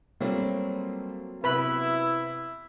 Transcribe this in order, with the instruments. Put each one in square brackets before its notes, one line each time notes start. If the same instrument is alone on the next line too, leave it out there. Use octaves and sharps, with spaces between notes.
[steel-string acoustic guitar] F#3 A#3 C4 [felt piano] G3 A3 F4
[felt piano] C3 B3 [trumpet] E4 [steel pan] B4 B5